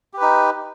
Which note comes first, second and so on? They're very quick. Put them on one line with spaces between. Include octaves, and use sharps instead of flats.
G4 B4 D#4